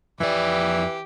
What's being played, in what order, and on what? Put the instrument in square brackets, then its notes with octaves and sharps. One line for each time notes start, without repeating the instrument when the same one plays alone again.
[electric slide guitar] F2 D5 [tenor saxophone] E3 [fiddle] G4